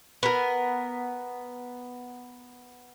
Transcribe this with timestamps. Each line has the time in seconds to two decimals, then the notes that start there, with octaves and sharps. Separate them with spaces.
0.23 B3 A#4